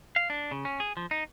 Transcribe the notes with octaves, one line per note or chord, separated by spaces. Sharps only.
F5
D4
C#3
C#4
G#4
F3
D#4